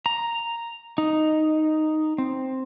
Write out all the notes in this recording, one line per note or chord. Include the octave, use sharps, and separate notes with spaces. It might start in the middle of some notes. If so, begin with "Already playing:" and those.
A#5
D#4
C4